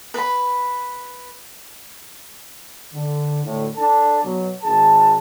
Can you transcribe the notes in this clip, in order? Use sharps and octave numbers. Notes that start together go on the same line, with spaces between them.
B4 B5
D3
D2 A2
D4 A4 A5
B2 F#3
G#1 G#4 A5